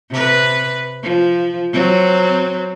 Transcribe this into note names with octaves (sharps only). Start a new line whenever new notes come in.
C3 B4
F3
F#3 C4